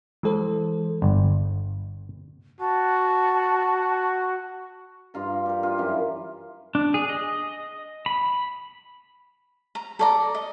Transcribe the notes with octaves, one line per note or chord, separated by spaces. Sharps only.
E3 G#3 A4 C5
G1
F#4 A5
G2 F4 A#5
G4 A#4
F4
F#2 E3
D4
G#4
D#5
B5
A#5
A4 D5 A#5
D#5